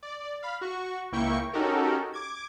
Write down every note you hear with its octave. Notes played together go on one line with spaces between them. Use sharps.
D5
F5 B5
F#4 C#6
C#2 A#3 E4 G5 C#6 C#7
C#4 D#4 F#4 G4 A4 A#4
D6 G#6